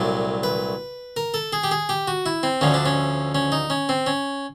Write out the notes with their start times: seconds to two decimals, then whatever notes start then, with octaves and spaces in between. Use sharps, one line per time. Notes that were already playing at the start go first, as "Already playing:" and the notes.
Already playing: C2 A#2 F#3 A3 D5
0.43 B4
1.17 A#4
1.34 A4
1.53 G#4
1.64 G4
1.71 G#4
1.89 G4
2.08 F#4
2.26 E4
2.43 C4
2.61 D2 D3 F3 C#4
2.74 D4
2.86 C#4
3.35 C#4
3.52 D#4
3.70 C#4
3.89 C4
4.07 C#4